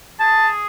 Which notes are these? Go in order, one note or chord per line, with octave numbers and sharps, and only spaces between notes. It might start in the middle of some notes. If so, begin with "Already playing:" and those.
G#4 A5